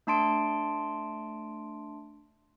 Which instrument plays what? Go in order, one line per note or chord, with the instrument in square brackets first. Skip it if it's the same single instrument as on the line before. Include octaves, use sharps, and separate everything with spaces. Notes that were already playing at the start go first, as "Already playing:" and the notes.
[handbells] A3 D4 A5 C6 D7